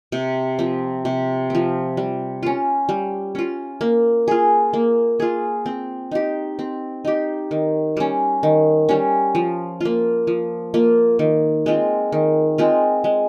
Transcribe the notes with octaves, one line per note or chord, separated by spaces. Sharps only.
C3
F3 C4
C3
F3 C4
G3
C#4 F4
G3
C#4 F4
A#3
F4 G#4
A#3
F4 G#4
C4
D#4 G4
C4
D#4 G4
D#3
G3 C#4
D#3
G3 C#4
F3
A#3 F4
F3
A#3 F4
D#3
G#3 C4 F4
D#3
G#3 C4 F4
G#3